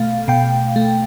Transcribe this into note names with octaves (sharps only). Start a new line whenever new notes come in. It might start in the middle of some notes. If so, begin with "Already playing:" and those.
Already playing: B2 A3 F5
B2 G5
A3